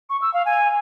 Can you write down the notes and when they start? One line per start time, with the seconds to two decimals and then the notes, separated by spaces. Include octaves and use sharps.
0.10 C#6
0.22 E6
0.34 F5
0.46 G#5